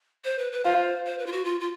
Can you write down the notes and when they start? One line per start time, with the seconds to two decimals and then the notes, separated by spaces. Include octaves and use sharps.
0.25 C5
0.39 B4
0.52 B4
0.64 F4 C5
1.05 C5
1.19 B4
1.26 F4
1.32 F#4
1.45 F4
1.60 F4